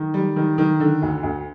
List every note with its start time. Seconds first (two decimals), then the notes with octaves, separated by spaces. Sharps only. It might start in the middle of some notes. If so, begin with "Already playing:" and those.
Already playing: D#3
0.14 G3
0.36 D#3
0.58 D#3
0.80 D3
1.02 D2
1.23 D2